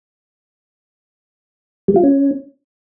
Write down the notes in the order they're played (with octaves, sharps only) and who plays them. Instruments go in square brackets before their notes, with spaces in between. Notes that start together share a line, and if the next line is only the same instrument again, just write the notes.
[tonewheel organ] G3
F4
C#4